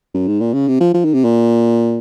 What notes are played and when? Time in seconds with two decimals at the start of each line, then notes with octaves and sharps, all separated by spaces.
0.14 F#2
0.28 G#2
0.41 A#2
0.53 C#3
0.68 C3
0.80 F3
0.94 F3
1.05 D#3
1.14 C3
1.25 A#2